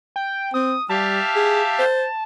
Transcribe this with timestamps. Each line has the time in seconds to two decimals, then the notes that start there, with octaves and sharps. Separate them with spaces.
0.16 G5
0.54 C4 D#6
0.89 G3 G4 E5 F5 A5
1.36 G#4
1.79 C5